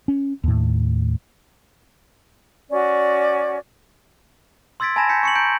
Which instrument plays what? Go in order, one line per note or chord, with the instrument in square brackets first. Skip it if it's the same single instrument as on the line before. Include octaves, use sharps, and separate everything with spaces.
[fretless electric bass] C#4
D#2 A2
[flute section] C#4 F#4 D5
[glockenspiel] C6 E6 G#6 A6 B6 D7
G#5 A5 B5 G#6 A#6 E7
G#5 A5 G6 B6 C#7
C#6 C#7 F#7
A#5 G6 D7